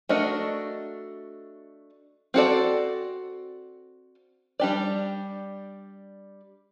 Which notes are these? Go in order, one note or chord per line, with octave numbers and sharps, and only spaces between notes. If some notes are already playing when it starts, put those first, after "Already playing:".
A3 D4 F#4 A#4 D#5
C4 F#4 A4 D5
G3 D4 G4 D5